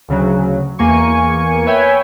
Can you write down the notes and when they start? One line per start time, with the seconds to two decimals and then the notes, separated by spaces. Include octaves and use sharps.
0.09 D2 C#3 F#3
0.79 E2 A#3 G#5 C#6 C#7
1.66 B4 C#5 E5 G5 G#5